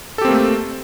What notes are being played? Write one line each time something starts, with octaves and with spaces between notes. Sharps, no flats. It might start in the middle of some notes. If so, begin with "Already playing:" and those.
A3 A#3 C4 G4 A4